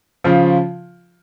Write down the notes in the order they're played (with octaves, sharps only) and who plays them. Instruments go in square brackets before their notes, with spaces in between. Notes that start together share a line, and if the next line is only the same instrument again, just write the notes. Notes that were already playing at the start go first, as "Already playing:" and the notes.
[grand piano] C#3 F3 F4